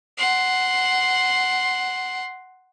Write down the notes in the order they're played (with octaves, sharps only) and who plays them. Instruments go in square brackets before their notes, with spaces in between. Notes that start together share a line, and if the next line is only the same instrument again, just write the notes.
[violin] F#5 C6